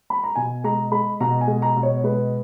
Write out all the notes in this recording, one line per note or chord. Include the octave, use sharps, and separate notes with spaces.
B5
A#5
B2 G#5
G#3 A#5
G#3 B5
B2 A#5
G#5
G#3
A#5
B2
C#5
G#3 B4